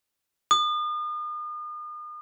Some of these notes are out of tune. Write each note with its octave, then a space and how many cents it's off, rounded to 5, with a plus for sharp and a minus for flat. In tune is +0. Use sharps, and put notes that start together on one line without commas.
D#6 -40